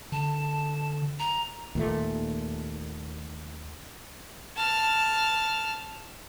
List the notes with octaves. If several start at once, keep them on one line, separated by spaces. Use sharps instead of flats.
D3 A5
A#5
D#2 A#2 A3
A5 F6